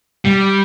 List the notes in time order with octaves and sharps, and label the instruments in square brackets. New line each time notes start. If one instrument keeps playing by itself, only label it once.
[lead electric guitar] G3